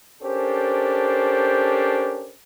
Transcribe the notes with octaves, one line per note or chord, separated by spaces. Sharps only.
C#4 D4 G4 A4 A#4 C5